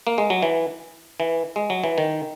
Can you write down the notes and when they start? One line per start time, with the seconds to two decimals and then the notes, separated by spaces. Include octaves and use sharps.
0.07 A#3
0.18 G#3
0.30 F#3
0.42 E3
1.20 E3
1.56 G#3
1.70 F#3
1.84 E3
1.98 D#3